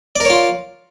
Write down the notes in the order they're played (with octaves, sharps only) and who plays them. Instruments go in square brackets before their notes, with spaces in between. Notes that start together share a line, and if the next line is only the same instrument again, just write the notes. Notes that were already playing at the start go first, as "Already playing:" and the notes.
[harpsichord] D5
A#4
C#5
F4